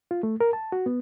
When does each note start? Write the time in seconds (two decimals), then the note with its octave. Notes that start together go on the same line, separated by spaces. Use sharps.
0.11 F4
0.23 A3
0.40 A#4
0.53 A5
0.72 F#4
0.86 B3